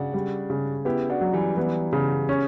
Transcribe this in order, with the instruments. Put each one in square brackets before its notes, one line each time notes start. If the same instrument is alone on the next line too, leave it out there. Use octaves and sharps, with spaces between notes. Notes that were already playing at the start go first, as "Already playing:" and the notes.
Already playing: [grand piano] C#3 [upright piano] D4 F#4
[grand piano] G3
C#3
[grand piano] B3 [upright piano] E4 G4
[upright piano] D4 F#4
[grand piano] F#3
[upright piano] E3 G3
[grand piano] E3 [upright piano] G3 B3
[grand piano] C#3
C#4